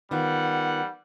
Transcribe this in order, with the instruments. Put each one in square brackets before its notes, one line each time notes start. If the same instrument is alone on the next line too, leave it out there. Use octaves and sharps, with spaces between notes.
[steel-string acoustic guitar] D#3 B3 F4 [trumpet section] G3 F#5